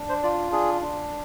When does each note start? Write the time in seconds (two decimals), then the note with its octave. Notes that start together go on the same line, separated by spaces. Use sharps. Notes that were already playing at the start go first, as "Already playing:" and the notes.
Already playing: D4
0.09 C5
0.23 F4 D5
0.52 D4 G#4
0.81 D4